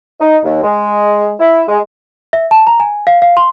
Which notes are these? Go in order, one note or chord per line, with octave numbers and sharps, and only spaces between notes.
D#4
D#2
G#3
E4
G#3
E5
A5
A#5
G#5
F5
F5
C6